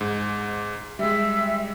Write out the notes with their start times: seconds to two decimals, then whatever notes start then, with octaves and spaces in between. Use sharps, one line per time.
0.01 G#2
0.99 G3 G#3 E5